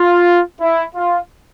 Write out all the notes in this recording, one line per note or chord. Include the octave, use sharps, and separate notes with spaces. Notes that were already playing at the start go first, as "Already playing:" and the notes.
Already playing: F4
E4
F4